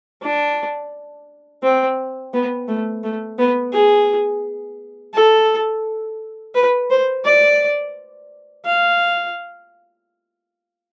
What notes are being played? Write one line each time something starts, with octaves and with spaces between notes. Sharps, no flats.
D4
C4
B3
A3
A3
B3
G#4
A4
B4
C5
D5
F5